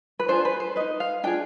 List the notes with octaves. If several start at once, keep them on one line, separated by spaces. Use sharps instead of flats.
B4
D4 F4 G#4 C5
B4
C5
D#4 B4 D#5
F5
D4 F4 G#4 G5